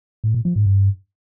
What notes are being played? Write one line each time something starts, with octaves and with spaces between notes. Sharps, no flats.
A2
A#2
F3
G#2
G2